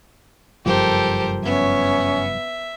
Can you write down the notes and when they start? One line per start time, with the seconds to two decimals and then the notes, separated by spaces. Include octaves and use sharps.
0.66 F#1 G2 F3 G4 A4 A#4 C5
1.45 B3 C#4 E5